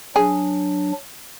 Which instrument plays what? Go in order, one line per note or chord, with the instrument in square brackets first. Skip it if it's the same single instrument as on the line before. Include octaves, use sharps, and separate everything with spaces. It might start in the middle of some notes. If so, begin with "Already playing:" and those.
[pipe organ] F#3 D4 [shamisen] G#4